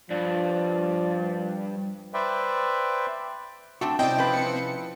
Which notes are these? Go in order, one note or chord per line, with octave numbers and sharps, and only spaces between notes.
G2 F3 D5
B4 C5 D5 E5 G5
A3 C4 D4 F#4
C3 C4 C#4 E4 D5 D#5 G5
F3 B4
C#7